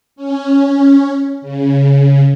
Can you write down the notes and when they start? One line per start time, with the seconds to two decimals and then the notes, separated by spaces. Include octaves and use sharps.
0.16 C#4
1.42 C#3